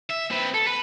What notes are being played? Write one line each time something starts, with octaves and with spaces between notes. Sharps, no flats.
E5
C4 B4
A4
B4